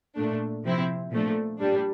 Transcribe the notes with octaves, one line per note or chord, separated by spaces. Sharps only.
A#2 A3 D4
C3 F3 C4 E4
A#2 F3 A3 D4
A#2 G3 D4